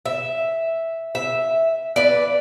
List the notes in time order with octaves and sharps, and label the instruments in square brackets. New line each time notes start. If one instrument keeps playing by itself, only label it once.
[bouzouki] E5
E5
B4 D5